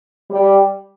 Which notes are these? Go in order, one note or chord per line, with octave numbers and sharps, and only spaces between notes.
G3